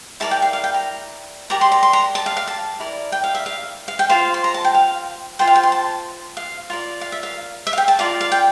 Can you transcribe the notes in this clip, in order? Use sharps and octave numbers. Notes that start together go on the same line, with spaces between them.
E4 A#4 D5 A5
G5
F5
F5
G5
A#5
G4 A#4 D5 A#5
C6
A#5
C6
A#5
A5
F5
F5
A5
E4 A#4 D5
G5
F5
E5
F5
F5
G5
F4 C5 F5
C6
A#5
A5
G5
F5
F4 C5 G5
F5
G5
C6
A5
F5
F4 A#4 D5
F5
E5
F5
E5
F5
G5
A5
F4 A#4 D5 F5
F5
G5